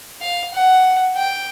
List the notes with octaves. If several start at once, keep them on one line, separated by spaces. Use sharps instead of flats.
F5
F#5
G5